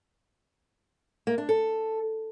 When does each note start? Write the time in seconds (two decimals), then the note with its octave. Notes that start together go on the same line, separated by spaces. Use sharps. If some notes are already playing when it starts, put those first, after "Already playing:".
1.27 A#3
1.38 D4
1.49 A4